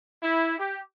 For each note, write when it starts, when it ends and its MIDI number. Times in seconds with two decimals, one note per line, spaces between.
0.22 0.58 64
0.58 0.79 67